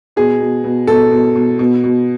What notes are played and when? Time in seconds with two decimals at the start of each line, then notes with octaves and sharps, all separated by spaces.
0.16 B2 G#4
0.40 B2
0.64 B2
0.87 B2 A4
1.12 B2
1.36 B2
1.59 B2
1.84 B2